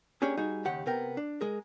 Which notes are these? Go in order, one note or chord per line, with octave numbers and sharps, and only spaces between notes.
A#3 C#4 D4 G4 G#4
G3 D#4 F#4 G#4
D#2 C#3 G4 F#5
C3 B3 A#4 G5
D4
G#3 G#4 A#4